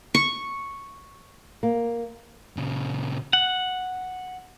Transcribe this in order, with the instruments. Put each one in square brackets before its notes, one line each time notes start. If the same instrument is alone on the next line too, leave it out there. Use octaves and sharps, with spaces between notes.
[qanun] C#6
[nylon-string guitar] A#3
[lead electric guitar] A#2 C#3
[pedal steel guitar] F#5